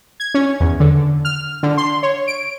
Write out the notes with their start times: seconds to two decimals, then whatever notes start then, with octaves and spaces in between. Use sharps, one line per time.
0.20 G#6
0.34 C#4
0.60 E2
0.80 D3
1.25 F6
1.63 D3
1.77 C6
2.03 C#5
2.28 D7